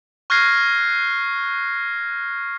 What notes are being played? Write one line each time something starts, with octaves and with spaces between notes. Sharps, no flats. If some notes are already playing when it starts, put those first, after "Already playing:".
C#6 F6 F#6 G#6 A#6 C7